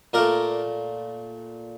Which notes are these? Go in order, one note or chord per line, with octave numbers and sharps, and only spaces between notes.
A#2 A3 A#4 D5